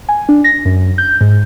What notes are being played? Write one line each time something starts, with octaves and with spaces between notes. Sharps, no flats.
G#5
D4
A#6
F#2
G6
G#2